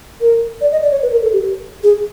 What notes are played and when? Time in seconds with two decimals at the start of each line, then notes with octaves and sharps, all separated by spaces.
0.21 A#4
0.61 D5
0.72 D#5
0.82 D5
0.91 C#5
1.02 B4
1.11 A#4
1.22 A4
1.33 G4
1.83 G#4